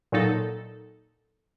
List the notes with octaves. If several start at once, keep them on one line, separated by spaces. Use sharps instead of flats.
A#2 F#3 D#4 A4